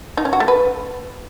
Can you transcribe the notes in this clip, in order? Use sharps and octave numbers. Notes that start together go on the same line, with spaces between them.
D#4
C#4
F#4
A3
B4